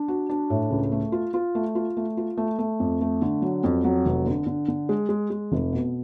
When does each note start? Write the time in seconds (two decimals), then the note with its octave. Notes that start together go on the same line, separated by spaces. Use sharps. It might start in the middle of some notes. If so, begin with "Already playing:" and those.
Already playing: D4
0.08 F#4
0.29 D4
0.50 A2
0.71 C#2
0.92 A3
1.12 F4
1.34 F4
1.55 A3
1.75 F4
1.97 A3
2.17 F4
2.37 A3
2.59 A3
2.80 F2
3.01 A3
3.22 D3
3.42 F#3
3.64 F2
3.84 F#3
4.06 F1
4.26 D3
4.47 D3
4.68 D3
4.89 G#3
5.09 G#3
5.30 G#3
5.52 F1
5.72 B2